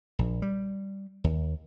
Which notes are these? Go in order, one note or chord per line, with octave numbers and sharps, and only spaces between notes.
A#1
G3
D#2